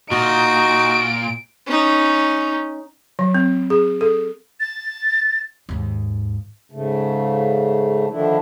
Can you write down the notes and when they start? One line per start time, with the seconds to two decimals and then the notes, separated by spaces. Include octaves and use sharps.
0.11 A#2 D#4 F#4 D7
1.67 C#4 D#4
3.19 F#3
3.34 C4
3.70 G#4
4.01 A4
4.60 A6
5.69 D#2 G#2
6.72 G#2 C#3 A3
8.10 D3 D#3 F3 A3 D4 E4